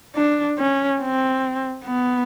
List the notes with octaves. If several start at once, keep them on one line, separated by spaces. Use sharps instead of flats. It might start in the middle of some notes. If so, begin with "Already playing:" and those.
D4
C#4
C4
B3